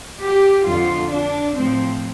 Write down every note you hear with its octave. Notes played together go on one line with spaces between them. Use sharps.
G4
F2 D3 F3 F4
D4
A2 F3 C4